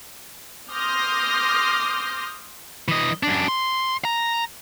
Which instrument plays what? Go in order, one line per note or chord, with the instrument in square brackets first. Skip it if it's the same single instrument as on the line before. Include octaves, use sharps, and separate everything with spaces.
[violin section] C6 D6 D#6 F6 G6 A#6
[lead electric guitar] E3 D#5
F#2 D4
C6
A#5